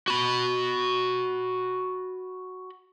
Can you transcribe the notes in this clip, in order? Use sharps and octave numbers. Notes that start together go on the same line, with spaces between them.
F#4 B5